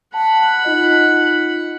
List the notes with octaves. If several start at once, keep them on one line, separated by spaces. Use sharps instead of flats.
F#5 A5 B5
D#4 F4 D#5